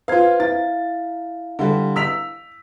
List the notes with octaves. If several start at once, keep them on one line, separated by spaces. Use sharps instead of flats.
F4 B4 C5 F5 G#6
E4 F5 A6
D3 G3
E6 B6 F7